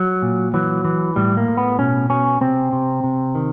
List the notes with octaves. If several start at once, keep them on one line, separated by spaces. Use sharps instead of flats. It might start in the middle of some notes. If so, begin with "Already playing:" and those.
Already playing: F#3
A#2
E3 F#3
E3
A2 G3
A#3
A2
B3
B2 C#4
B2 C#4
C3 C4
C3
C3
D#3